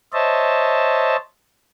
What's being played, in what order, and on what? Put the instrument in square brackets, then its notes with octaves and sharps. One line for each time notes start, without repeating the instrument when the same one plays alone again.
[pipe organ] C5 C#5 D#5 E5 A5